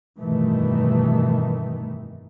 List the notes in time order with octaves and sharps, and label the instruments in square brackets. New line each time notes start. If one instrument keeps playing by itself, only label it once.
[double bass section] F1 G2 B2 D#3 E3 A3